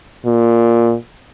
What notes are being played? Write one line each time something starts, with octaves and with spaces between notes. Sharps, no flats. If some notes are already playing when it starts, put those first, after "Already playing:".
A#2